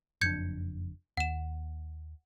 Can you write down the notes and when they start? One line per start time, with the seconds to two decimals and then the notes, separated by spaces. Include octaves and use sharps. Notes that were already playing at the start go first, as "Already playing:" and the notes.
0.21 F#1 F2 D4 G6 G#6 C#7
1.17 D#2 F#5 E7